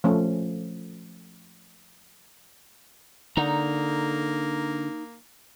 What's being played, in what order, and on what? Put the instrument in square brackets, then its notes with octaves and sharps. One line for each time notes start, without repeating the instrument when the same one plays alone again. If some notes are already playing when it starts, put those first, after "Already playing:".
[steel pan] F3 A3 C#4
[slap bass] D3 [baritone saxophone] A#3 [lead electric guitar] D#4 A#5